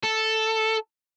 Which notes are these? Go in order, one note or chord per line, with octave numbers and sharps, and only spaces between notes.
A4